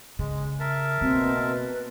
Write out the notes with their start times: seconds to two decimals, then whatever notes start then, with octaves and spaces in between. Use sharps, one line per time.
0.19 C#3 G#3
0.60 A#4 E5 A5
1.01 B2 A#3 C4
1.50 B4